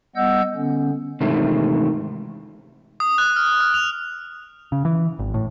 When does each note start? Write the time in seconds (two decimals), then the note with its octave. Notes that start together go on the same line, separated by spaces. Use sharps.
0.16 G3 B3 D#5 F#5 E6 G6
0.55 D3 B3 C#4
1.20 G#2 C3 D#3 E3 A3
3.00 D#6
3.18 F#6
3.36 F6
3.61 F6
3.74 F7
4.72 C#3
4.85 E3
5.19 G#1
5.34 A2